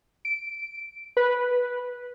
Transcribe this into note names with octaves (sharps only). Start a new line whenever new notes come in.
D7
B4